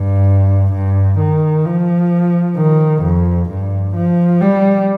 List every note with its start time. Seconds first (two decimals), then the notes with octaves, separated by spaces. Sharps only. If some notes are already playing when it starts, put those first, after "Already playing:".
Already playing: G2
0.73 G2
1.19 D#3
1.66 F3
2.57 D#3
3.03 F2
3.50 G2
3.96 F3
4.41 G3